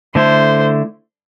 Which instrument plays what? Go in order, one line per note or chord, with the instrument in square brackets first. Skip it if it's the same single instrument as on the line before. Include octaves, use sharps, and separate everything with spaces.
[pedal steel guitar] D3 A3 E4 [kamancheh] C5